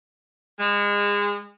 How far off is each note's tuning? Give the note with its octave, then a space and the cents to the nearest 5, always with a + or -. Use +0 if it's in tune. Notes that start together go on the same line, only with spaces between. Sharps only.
G#3 -30